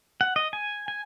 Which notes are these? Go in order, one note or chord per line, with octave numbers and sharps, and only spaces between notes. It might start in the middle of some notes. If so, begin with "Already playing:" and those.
F#5
D#5
G#5
G#5